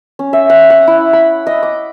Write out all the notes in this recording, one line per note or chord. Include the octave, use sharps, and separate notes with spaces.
C#4
E5
F#5
F#5
E4
B5
D#5
D6